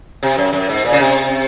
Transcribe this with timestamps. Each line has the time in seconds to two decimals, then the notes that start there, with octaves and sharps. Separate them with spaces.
0.23 C3
0.38 F#2
0.53 F#2
0.69 G#2
0.85 A#2
0.92 C#3
1.00 C3